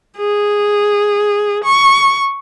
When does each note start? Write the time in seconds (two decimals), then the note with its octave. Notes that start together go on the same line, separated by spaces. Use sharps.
0.18 G#4
1.64 C#6